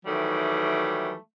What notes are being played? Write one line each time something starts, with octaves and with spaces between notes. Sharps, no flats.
D#3 E3 F#3 G3 A3